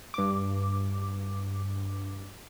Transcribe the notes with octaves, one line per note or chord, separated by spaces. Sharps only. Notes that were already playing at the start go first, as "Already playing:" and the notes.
G2 D6